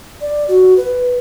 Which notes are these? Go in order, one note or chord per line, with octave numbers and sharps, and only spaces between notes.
D5
F#4
B4